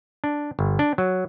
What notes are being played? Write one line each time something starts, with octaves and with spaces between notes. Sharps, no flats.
D4
G1
D4
F#3